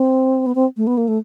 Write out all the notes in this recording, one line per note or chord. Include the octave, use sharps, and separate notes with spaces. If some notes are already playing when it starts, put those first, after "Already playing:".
Already playing: C4
B3
C4
A3
B3
A#3
A3